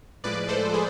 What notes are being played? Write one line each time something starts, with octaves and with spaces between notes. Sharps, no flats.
A2 F3 G#3 B4 D5
A4 C5
F3 G#3 G#4